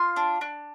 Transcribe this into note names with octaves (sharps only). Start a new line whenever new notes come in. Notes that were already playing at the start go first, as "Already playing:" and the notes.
Already playing: F4 C6
D4
D4